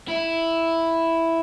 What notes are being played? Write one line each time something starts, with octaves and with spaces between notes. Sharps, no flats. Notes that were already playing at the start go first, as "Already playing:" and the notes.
E4